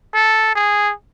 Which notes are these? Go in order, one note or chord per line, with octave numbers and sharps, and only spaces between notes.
A4
G#4